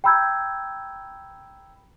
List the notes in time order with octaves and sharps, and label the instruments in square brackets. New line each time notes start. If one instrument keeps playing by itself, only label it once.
[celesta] G5 A#5 B5 E6 G6 G#6